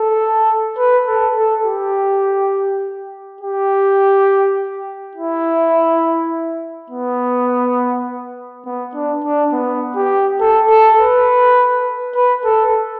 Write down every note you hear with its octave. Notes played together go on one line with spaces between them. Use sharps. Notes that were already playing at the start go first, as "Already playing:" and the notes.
Already playing: A4
B4
A4
A4
G4
G4
E4
B3
B3
D4
D4
B3
G4
A4
A4
B4
B4
A4